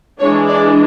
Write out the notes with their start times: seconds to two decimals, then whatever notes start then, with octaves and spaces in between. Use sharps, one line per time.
0.19 E3 G#3 D4 C#5
0.47 D5